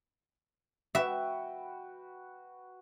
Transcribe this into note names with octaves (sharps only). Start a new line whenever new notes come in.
F#4 B4 E5 G5